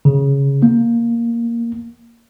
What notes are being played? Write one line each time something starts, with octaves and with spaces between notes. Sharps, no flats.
C#3
A#3